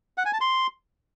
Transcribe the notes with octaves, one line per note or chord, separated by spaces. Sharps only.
F#5
G#5
A5
C6